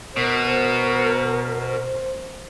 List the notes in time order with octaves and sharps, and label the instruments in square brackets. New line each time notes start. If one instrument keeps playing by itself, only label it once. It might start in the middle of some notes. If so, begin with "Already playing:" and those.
[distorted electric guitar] B2 [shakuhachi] A#4 [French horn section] C5